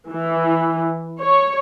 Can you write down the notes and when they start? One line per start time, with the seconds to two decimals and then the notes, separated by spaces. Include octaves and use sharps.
0.10 E3
1.20 C#5